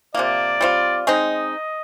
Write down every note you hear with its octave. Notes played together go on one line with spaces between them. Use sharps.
C3 F3 A#3 D5
G3 C4 F4
G#3 C4 D#4 D#5